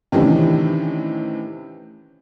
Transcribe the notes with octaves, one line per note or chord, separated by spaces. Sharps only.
A2 C3 D#3 E3 C#4 D4